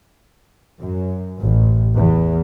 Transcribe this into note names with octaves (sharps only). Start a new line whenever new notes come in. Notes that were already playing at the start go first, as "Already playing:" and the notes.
F#2
A1
E2